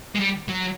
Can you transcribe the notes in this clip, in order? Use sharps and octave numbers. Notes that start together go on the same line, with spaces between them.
G#3
G3
F#3